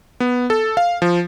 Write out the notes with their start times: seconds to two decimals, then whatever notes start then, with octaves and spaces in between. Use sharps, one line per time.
0.20 B3
0.50 A4
0.77 F5
1.02 F3